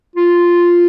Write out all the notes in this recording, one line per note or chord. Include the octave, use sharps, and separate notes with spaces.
F4